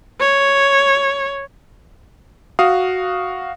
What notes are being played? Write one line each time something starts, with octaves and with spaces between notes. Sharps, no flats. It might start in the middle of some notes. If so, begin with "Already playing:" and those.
C#5
F#4 F5 D#6